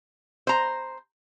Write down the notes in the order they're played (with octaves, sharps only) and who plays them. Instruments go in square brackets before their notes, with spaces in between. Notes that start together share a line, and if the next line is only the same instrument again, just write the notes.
[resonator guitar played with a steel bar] C5 A#5